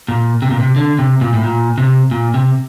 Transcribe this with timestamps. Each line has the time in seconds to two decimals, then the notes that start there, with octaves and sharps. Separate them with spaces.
0.08 A#2
0.42 C3
0.51 A#2
0.60 C3
0.76 D3
0.99 C3
1.21 A#2
1.34 A2
1.44 A#2
1.78 C3
2.11 A#2
2.34 C3